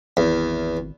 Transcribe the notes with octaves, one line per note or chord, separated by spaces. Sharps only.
G#1 E2